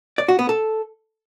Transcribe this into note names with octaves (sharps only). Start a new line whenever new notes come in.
D5
F#4
B3
A4